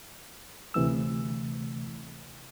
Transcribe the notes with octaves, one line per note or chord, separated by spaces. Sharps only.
D2 C3 E3 A3 E6